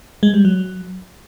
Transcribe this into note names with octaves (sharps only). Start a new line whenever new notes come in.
G#3
G3
F#3